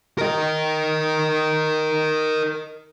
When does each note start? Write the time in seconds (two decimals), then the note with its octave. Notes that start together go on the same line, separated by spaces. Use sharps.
0.18 A#4 D#5